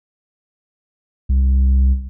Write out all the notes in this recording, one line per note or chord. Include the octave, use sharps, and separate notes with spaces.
C2